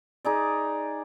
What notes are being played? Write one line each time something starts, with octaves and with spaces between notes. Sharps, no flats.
D#4 G#4 D5